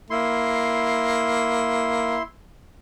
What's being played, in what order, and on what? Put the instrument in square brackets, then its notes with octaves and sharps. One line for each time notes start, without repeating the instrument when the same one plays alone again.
[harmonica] A#3 [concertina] E4 C6